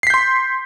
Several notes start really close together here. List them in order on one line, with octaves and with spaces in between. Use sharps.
C7 B6 G6 C6